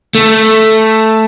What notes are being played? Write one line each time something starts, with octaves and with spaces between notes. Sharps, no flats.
A3